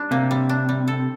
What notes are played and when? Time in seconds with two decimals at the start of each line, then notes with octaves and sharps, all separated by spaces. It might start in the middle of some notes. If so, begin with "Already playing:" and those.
Already playing: G3 D4
0.11 C3 A#3
0.31 G3
0.49 D4
0.69 G3
0.88 A4